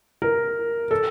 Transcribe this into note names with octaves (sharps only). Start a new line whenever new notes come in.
A#4
A4